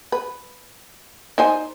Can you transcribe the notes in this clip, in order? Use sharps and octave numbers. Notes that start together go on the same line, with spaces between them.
B4
D#4 C5 G#5